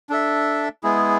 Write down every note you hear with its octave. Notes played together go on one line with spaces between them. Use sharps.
D4 A4 E5
G#3 B3 E4 G#4